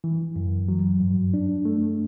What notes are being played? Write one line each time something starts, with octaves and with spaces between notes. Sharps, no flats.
E3
F#2
F#3
G2
D4
A3